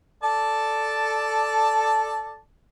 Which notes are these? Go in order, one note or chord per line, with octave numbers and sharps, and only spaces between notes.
A4 D5 A5